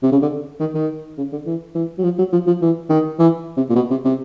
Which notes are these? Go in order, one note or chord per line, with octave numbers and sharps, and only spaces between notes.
C3
C#3
D3
D#3
D#3
C#3
D3
E3
E3
F#3
F3
F#3
F3
F3
E3
D#3
E3
C3
A#2
B2
C3
C3